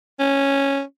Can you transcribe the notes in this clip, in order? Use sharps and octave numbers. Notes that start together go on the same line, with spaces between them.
C#4